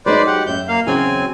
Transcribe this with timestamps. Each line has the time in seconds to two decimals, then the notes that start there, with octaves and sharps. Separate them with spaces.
0.06 F#3 G#3 D#4 B4 C5 D5
0.27 G4 F#5
0.46 F#2 E5 G6
0.68 A#3 F5
0.87 E2 C#3 F#3 C4 G#5